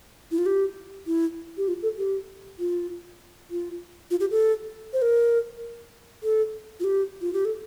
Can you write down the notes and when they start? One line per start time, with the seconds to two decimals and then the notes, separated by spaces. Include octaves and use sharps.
0.31 E4
0.38 F4
0.46 G4
1.07 E4
1.57 G4
1.68 F4
1.82 A4
1.98 G4
2.59 F4
3.51 F4
4.11 F4
4.20 G4
4.31 A4
4.93 C5
5.02 A#4
6.23 A4
6.80 F4
6.84 G4
7.21 F4
7.33 G4
7.45 A4